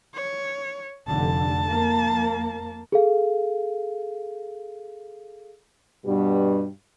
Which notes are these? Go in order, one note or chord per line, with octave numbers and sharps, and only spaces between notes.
C#5
F1 D3 A5
F2 A#3
G#4 A4 F5
G2 B2 G3